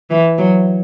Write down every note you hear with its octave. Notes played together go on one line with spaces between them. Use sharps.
E3
F#3